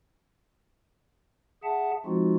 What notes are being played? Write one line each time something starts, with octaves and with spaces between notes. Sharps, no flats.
G#4 E5 F#5 A5
F3 G#3 C4 D#4 F4 F#4